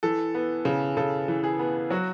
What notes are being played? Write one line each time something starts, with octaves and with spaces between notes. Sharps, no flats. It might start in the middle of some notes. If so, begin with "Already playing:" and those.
E3 A4
B3
C#3
C#3 A4
E3
G#4
B3
F#3 F#4